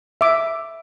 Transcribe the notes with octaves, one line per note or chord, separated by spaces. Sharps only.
E5 D6